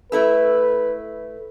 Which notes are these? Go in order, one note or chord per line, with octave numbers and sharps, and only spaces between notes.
A3 E4 A4 B4